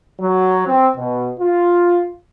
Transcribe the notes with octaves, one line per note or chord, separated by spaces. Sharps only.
F#3
C4
B2
F4